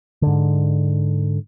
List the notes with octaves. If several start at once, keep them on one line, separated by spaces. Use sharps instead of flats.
G#2 D3